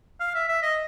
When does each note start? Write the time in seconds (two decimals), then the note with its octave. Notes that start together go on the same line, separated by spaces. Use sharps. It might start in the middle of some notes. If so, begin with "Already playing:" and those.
0.20 F5
0.35 E5
0.48 E5
0.62 D#5